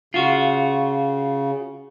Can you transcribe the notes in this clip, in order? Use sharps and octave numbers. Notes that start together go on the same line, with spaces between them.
C#3 F4 F#4